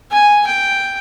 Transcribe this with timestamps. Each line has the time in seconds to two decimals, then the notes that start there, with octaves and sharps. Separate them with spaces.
0.11 G#5
0.46 G5